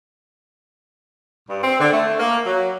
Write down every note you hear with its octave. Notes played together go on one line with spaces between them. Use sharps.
G2
C4
D3
A3
A#3
F#3